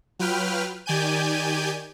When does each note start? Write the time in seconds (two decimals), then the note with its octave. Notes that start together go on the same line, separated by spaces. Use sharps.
0.19 F#3 F4 B4 G5 F6
0.86 D#3 G4 D5 G#5 G6 D#7